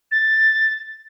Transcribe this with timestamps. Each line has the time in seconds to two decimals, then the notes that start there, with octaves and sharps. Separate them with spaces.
0.11 A6